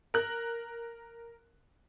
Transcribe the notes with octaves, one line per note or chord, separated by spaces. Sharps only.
A#4 F#6